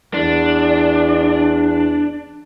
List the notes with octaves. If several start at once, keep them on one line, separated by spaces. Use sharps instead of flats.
E2 D4